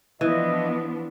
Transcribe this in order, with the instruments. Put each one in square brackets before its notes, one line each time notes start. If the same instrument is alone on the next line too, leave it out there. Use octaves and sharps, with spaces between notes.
[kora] E3 [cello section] F3 B3 D4 [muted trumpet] D#5